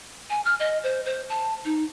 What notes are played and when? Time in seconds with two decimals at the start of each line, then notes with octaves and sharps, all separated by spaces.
0.30 G#5
0.45 F6
0.60 D#5
0.84 C5
1.06 C5
1.30 A5
1.65 D#4